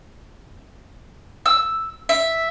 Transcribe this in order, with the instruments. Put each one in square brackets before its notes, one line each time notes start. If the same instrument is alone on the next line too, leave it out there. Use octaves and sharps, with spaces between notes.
[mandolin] E6
E5